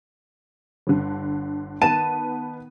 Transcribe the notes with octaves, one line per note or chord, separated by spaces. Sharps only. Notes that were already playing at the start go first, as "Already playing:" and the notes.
G1 D3
D#3 B3 A5 D#7